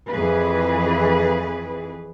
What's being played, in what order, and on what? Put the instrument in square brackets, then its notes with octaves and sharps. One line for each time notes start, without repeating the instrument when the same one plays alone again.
[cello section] F2 E3 G#4 B4